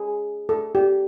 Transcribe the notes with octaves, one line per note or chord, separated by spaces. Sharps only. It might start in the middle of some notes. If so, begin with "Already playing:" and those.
Already playing: G#4
A4
G4